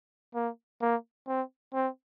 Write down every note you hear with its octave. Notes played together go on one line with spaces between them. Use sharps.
A#3
A#3
C4
C4